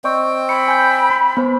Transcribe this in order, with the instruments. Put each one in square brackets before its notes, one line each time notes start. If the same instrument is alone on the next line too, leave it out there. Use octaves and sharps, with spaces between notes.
[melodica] C4 G5 [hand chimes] D5 D#5 C#6
[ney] B5 [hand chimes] C#7
[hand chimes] G#5 G6
B3 C5